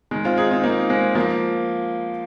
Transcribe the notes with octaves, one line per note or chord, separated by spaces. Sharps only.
D#3 G#3
C4 F4
D#4 G#4
C4 F4
A#3 D#4
G#3 C4
F3 A#3